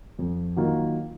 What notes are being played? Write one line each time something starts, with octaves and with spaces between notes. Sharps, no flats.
F2
D#3 F#3 A#3 F4